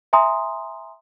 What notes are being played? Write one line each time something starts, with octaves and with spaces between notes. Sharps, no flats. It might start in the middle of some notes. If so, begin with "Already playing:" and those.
E5 G#5 A#5 C6 D#6